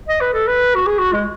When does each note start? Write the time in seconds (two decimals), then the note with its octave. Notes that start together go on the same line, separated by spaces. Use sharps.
0.09 D#5
0.21 B4
0.33 A4
0.47 B4
0.75 F#4
0.87 G#4
0.99 F#4
1.13 G#3